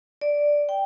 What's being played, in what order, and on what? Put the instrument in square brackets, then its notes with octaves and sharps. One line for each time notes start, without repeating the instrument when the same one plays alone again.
[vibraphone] D5
G5